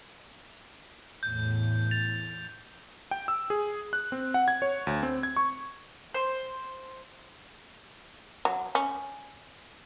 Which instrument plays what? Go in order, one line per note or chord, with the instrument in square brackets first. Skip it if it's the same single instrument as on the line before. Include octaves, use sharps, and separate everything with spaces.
[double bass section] E2 A2 [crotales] G6
[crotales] A6 F7
[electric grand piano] G5
E6
G#4
F#6
C4
F#5
G#6
C#5
D2
C4
G#6
C#6
[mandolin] C5
[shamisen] F#3
C#4